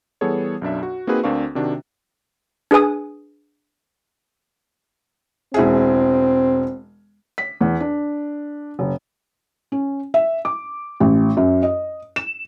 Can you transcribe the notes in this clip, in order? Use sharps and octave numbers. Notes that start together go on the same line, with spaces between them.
E3 G3 B3 G#4 A4 C#5
B1 F#2 D4 E5
F#4
A#3 C4 D#4 F#4 G#4 B4
D2 C4 D4 A#4 F5 C#6
C3 D#3 D4 F#4
D4 G#4 B4 G#5 D#6
E1 C4 E4 G#4
B6
E2
D4
F#1
C#4
E5
D6
A1
F#2
D#5
E7